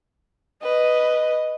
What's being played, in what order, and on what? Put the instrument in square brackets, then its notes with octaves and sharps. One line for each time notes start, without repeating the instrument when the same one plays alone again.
[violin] B4 [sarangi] D#5